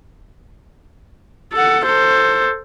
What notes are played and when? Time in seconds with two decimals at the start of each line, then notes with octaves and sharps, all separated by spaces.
1.54 A4 F#5
1.85 A4 C5